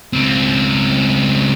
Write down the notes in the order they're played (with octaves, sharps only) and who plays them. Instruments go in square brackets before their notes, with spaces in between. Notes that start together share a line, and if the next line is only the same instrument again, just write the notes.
[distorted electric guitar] C#2 C4